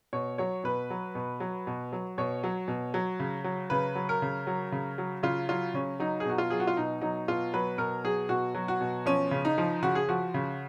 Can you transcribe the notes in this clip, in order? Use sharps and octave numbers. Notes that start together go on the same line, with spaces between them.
B2 C#5
F#3 C#5
B2 B4
F#3
B2
F#3
B2
F#3
B2 C#5
F#3
B2
F#3
C#3
F#3
C#3 B4
F#3
A#4
C#3
F#3
C#3
F#3
C#3 F4
F#3 F4
C#3 C#4
F#3 D#4
G#4
B2 F#4
F4
F#3 G#4
F#4
F4
B2 D#4
F#3 D#4
B2 F4
F#3 B4
B2 A#4
F#3 G#4
B2 F#4
F#3
F#4
B2
F3 C#4
C#3
D#4
F3
C#3 F#4
G#4
F3 F#4
C#3